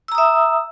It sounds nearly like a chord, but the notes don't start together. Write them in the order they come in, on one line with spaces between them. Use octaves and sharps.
E6 A#5 D#6 E5